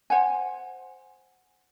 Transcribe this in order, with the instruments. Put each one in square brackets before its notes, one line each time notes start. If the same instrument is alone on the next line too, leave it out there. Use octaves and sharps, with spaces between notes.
[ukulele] C5 F#5 G#5